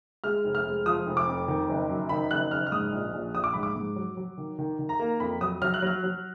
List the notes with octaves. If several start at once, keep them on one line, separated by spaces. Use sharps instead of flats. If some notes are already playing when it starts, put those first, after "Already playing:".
G#3 F6
F1
F6
G#3
F3 D#6
F1
D6
F2
D#3
F#1
F#2
D#3 B5
F#1 F#6
F#1 F6
F6
G#2 D#6
A#1
A#1
A#1 D#6
D6
G#2 B5
D6
G#2
F#3
F#3
D#3
D#3
D#3
A#5
A#3
F2 B5
F#3 D#6
F#3 F6
F#6
F#3 F6
F#3